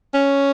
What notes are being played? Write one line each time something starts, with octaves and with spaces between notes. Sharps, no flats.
C#4